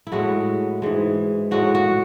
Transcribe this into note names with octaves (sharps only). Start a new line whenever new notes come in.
E4
A2 G#3 F#4
G#2 E3 G#3
A2 G#3 F#4
F#4